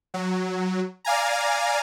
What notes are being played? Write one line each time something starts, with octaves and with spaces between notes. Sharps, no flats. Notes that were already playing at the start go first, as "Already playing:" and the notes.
F#3
D5 F5 G#5 A#5